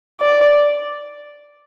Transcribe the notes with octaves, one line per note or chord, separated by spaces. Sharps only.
D5